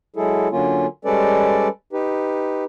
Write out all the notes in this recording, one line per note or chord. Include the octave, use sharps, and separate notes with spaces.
F#3 G#3 E4 G#4 A4
D3 F#3 A#3 C#4 F4
G3 G#3 C#4 A4 B4 D5
D#4 G4 B4